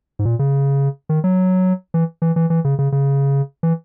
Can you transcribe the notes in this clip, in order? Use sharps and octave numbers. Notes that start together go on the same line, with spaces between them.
G#2
A#2
C#3
D#3
F#3
E3
E3
E3
E3
C#3
C#3
C#3
E3